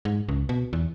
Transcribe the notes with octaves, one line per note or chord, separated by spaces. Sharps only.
G#2
C#2
B2
E2